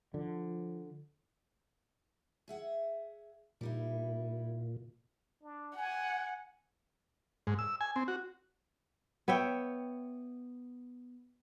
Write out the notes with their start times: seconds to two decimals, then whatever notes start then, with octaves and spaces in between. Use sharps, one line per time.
0.14 D3 F3
2.48 G#4 E5 F#5
3.61 A#2 G3 D#4 E4
5.42 D4
5.76 F#5 G#5
7.47 G#2
7.59 E6
7.81 G#5
7.96 C4
8.08 F#4
9.28 B3 C#5 E5 G5